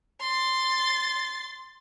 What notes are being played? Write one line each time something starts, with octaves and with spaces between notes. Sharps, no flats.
C6 A6